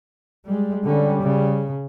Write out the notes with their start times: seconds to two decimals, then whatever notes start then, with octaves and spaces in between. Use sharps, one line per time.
0.45 G3 G#3
0.84 D3 G3 C#4
1.22 C#3